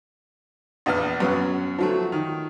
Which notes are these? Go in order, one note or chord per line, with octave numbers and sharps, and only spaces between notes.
A#1 E2 B3 F6
F#2 B3 C#4 F#5
F3 F#3 A3
D#3